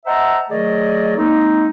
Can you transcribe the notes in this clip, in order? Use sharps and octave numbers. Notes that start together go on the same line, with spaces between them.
C5 D#5 E5 F#5 A5 A#5
D#3 F#3 A3 G#4 D5 D#5
G#3 A#3 C4 D#4